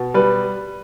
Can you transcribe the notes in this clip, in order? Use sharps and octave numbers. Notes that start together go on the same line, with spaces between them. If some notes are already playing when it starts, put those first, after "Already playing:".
Already playing: B2
G3 B4